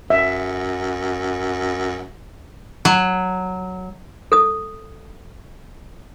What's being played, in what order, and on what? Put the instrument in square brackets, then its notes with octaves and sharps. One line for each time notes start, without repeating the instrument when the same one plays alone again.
[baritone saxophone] F#2 [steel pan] E5
[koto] F#3
[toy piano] A4 D#6